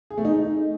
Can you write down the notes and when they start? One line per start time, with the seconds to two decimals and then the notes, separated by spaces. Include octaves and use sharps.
0.10 G#4
0.18 A3
0.25 D#4